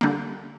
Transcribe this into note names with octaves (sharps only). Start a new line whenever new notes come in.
D3 G3 A#3